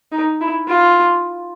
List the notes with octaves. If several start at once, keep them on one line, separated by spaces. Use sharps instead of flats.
D#4
E4
F4